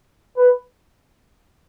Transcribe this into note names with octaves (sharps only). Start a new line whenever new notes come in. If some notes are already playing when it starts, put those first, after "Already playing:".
B4